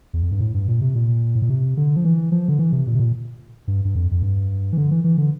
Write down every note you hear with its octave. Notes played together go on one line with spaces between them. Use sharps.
E2
F2
G2
A2
G2
A#2
C3
A#2
A2
A#2
C3
D3
F3
E3
F3
D3
E3
C3
A#2
C3
A#2
G2
G2
F2
F2
G2
E3
D3
E3
E3
D3